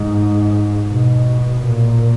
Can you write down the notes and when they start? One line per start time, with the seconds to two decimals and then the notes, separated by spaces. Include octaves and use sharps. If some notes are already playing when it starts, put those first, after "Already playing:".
Already playing: G#2
0.90 B2
1.65 A#2